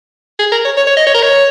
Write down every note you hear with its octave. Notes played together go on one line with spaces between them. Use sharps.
G#4
A#4
C#5
C#5
C#5
D#5
C#5
A#4
C#5